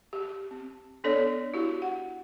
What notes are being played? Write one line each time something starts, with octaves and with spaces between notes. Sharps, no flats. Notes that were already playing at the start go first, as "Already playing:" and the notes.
G4
C4
B3 D4 A4 C#5 D5
E4 F#4 G4
F#5